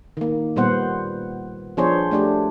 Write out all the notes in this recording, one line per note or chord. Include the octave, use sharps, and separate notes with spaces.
D#3 A#3
A#2 G3 B3 C5 F#5
F3 B3 D4 G#4 C5 C#5
A3 D4 G4